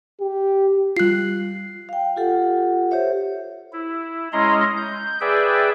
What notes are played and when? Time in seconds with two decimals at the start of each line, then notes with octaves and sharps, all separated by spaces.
0.21 G4
0.97 G3 F4 F#6 C7
1.89 F5 G5
2.16 F4 G4 A4 F#5
2.91 G4 C5 C#5 E5
3.73 E4
4.33 G#3 C#4 E4 D#5 A#5 C6
4.77 G6
5.21 G#4 B4 D5 E5 G5